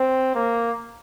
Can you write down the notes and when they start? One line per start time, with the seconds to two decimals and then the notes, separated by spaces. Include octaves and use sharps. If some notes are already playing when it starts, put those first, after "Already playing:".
Already playing: C4
0.35 A#3